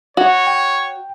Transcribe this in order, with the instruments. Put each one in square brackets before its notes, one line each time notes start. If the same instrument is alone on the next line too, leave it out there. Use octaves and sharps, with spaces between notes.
[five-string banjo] F#4 [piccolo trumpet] C#5
[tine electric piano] G5